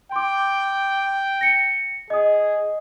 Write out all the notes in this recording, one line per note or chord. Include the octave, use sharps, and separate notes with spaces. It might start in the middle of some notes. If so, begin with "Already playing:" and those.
G5 C6 D6
A#6 C#7
G#4 D#5 D#6